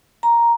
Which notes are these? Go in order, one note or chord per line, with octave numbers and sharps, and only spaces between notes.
A#5